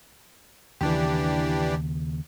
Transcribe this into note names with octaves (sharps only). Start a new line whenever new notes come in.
D#2 C#3 E3 D4 G4